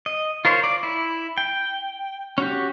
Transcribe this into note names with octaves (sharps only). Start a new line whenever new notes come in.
D#5
F4 A#4 C5 C#5
D5
E4
G5
C#4 F#4 G4